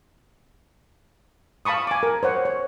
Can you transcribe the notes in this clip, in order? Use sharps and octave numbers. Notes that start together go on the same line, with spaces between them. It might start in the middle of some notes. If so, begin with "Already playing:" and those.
F5 A5 B5 C#6 D#6
G#5 D6
A#4
C5 C#5 F#5
C#5